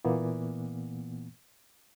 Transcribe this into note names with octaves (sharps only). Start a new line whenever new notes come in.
A#2 E3 A#3 B3